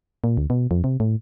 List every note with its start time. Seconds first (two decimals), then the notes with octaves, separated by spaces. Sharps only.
0.24 A#2
0.37 D2
0.50 B2
0.71 F2
0.84 C3
1.00 A2